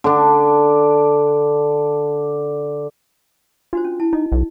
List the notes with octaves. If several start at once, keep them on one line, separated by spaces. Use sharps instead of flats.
D3 D4
D4 F4 F#4 C5
C#4
E4 A5
D#4 D#5
B1